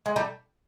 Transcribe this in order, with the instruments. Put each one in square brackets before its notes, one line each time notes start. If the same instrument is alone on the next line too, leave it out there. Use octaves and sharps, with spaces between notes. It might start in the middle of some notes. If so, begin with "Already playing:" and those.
[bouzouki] G#3
G3 A3